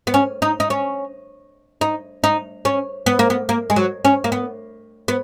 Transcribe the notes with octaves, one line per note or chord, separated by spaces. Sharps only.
B3
C#4
D#4
D#4
C#4
D#4
D#4
C#4
B3
A#3
B3
A#3
G#3
F#3
C#4
A#3
B3
B3